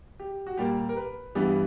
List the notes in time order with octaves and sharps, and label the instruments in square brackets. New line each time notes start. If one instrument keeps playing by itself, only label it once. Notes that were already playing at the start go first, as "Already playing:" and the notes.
[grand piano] G4
F#4
A#2 G3 A#3 G4
A#4
B4
G2 E3 G3 B3